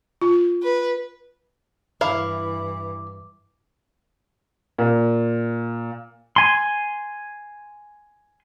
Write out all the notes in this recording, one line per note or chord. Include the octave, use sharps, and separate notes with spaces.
F4
B4
G2 E3 E4 F5 D6
A#2
G#5 C6